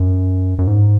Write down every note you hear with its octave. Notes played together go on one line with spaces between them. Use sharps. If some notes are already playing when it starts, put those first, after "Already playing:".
Already playing: F#2
F#2
G#2